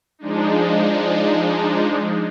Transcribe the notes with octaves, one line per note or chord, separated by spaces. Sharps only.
F3 G#3 D4 D#4